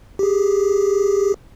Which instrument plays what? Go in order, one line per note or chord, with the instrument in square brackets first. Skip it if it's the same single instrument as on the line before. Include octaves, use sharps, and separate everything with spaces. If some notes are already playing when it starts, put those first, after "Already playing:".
[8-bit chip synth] G4 G#4